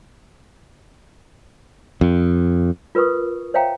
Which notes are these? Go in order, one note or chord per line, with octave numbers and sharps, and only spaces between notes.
F2
F4 A#4 B4 C#6 D#6
C5 C#5 E5 F5 G5 A#5